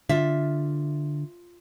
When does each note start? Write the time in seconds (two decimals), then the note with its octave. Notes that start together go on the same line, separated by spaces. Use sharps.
0.09 D3 F4 E5